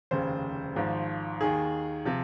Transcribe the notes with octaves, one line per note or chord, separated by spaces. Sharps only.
F1 D#2 C#3 C5
G#1 G#2 F3
D#2 D#3 G#4
C3 F3